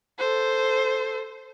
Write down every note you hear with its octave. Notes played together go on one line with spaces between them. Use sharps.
A4 C5